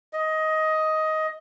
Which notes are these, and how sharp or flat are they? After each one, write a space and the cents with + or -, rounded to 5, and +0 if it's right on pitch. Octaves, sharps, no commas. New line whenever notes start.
D#5 +15